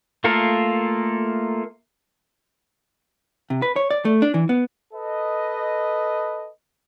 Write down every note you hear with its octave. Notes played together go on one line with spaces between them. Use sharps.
A3 A#3 F4 A4 A#4
C3
B4
C#5
D5
A3
D4
E3
B3
A4 B4 D#5